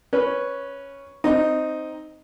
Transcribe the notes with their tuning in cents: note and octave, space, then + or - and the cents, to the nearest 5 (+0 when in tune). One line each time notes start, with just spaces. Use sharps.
C#4 +0 B4 -5
C4 +0 D#4 +0